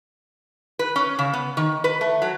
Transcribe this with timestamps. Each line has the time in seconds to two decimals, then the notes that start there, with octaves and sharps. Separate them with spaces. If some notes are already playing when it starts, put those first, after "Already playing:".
0.79 B4
0.96 C#4
1.19 C#3
1.33 B3
1.57 D#3
1.84 B4
2.01 A3
2.22 F#3